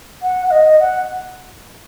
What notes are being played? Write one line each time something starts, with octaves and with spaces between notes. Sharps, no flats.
F#5
F#5
D#5
F#5